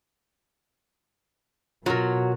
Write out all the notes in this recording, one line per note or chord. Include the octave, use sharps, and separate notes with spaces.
B2 F#3 F4 F#4 A#4